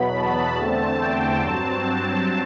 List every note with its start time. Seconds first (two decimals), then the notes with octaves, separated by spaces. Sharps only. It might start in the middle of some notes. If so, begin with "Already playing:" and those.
Already playing: E2 B2 F#3 B3 B5
0.14 A5
0.56 E2 D3 A3 C4
0.99 G5
1.41 G2 F#3 C4 A5